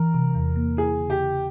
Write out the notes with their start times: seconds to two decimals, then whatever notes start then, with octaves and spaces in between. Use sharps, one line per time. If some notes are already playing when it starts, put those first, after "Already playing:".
Already playing: E3 A#4
0.14 C3
0.35 E2
0.56 A#3
0.77 E4 G#4
0.99 C#3
1.10 G4
1.21 C#3